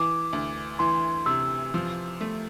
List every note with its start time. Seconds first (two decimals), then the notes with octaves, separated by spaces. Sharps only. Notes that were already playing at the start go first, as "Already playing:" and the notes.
Already playing: E3 D6
0.33 D2
0.79 E3 C6
1.26 C3 E6
1.74 F3
2.21 A3